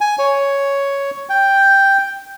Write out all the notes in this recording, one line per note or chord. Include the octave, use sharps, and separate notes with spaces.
G#5
C#5
G5